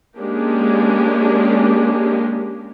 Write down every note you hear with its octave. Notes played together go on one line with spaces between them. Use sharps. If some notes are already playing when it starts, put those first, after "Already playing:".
G#3 A#3 C#4 D4 G4